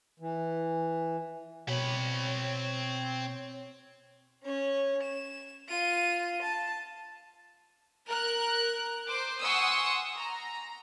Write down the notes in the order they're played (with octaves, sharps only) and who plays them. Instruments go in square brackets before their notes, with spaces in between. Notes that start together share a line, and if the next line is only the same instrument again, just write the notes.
[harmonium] E3
[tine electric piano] B2 [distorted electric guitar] C4 B5 [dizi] C#5
[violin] C#4 C#5
E7
F4 D#7
A5
[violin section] A#4 F#6
C5 D6
F#5 G#5 C6 C#6 D#6 E6
A#5